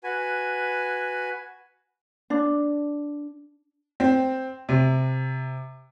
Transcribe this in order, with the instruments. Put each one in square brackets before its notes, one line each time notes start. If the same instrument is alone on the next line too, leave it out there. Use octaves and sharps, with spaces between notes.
[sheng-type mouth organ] F#4 B4 G#5
[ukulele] D4
[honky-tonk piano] C4
C3